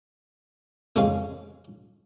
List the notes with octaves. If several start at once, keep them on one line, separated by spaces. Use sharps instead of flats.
A1 F2 C#3 G#3 C#4 F5